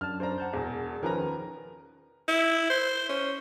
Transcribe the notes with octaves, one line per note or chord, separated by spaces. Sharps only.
F#2 D4 A5 F6
C5 D5 A#5
F#5 A5 G6
E1 E2
D#3 F3 C#4 A#4 B4 A#5
E4
C5
C#4